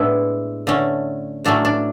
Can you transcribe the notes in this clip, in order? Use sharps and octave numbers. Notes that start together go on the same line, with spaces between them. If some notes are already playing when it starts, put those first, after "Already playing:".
Already playing: A2 G#3 B3 D4 E4
D3 A3 C#4
A2 F#3 A3 C#4 D4
D4